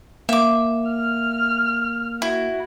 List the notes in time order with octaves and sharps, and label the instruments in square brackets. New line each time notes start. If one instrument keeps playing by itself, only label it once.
[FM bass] A#3 [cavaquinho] E5 D6
[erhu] F6
[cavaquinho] E4 [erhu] F#4